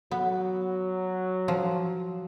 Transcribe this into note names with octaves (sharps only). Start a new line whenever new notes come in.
F#3 B3
F3